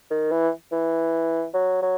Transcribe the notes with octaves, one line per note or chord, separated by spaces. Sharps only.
D#3
E3
E3
F#3
F#3